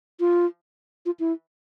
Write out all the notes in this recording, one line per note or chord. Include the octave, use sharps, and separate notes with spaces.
F4
F4
E4